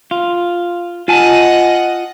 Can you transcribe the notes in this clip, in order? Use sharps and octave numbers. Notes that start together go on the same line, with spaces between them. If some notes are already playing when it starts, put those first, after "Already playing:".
F4
F4 D#5 F#5 G#5 A5